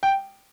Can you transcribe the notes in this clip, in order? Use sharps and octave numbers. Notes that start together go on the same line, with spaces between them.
G5